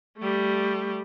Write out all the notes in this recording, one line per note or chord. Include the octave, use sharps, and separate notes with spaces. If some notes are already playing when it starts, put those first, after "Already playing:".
G3 A3